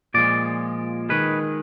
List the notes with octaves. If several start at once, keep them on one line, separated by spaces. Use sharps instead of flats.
A#2 F3 G#3 D5
D#3 G#3 B4